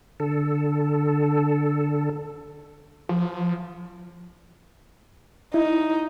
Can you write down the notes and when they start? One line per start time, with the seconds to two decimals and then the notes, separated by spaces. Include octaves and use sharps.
0.20 D3 A4
3.09 F3
5.54 D#4 E4